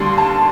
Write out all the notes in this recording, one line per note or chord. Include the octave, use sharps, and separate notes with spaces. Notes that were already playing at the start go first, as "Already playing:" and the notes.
Already playing: D#2 D3 G3 C6
A5